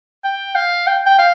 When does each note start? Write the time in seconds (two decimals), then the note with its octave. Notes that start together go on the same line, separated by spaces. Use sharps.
0.24 G5
0.55 F5
0.87 G5
1.06 G5
1.19 F5